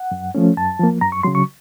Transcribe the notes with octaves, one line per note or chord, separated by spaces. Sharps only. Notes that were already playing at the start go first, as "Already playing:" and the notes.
Already playing: F#5
F#2
F3 A3 C#4
F#2 A5
F3 A#3
F#2 A#5
C#6
C#3 F#3 C6
C#6